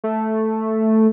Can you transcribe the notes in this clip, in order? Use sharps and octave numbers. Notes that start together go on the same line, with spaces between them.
A3